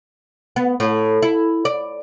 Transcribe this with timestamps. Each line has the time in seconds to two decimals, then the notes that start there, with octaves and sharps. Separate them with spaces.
0.56 B3
0.80 A2
1.23 E4
1.65 D5